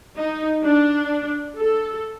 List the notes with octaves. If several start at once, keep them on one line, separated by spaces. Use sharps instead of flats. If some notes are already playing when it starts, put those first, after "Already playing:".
D#4
D4
A4